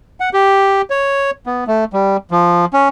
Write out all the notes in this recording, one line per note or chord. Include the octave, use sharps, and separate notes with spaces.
F#5
G4
C#5
B3
A3
G3
F3
C#4